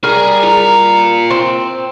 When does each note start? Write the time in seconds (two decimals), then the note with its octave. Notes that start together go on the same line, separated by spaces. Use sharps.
0.04 G3 G#4 A#4
0.43 F4 A#5
1.30 C4